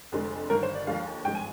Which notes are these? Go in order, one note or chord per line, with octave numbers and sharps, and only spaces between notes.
F1 F2 D3 G#3
G1 G2 D#3 A#4
C5
D5
D#2 D3 F3 G#3 F5
G#1 G2 F3 G#3 G5
G#5